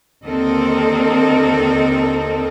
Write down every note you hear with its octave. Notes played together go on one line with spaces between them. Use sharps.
D#2 D3 C4 A4 A#4 D#5